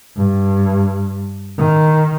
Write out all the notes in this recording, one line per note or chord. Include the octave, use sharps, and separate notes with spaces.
G2
D#3